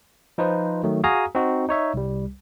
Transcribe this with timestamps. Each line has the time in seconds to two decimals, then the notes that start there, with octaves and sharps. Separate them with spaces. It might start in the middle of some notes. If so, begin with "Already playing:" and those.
0.38 F3 D#4 F4 B4 C5
0.84 D#3 F#3 A3
1.04 F#4 G#4 F5 G#5 A#5 D#6
1.35 C4 D#4 F#4
1.69 D#4 C#5 E5
1.94 C2 G3